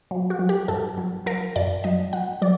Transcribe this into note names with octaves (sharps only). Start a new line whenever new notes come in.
F#3
F#4
F#3
G4
G2 A4
F#3
F#3 A#4
F#2 D5
F#3 D#5
F#3 F#5
F#3 D5